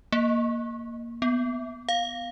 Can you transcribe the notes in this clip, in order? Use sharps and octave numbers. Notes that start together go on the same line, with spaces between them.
A#3
B3
F5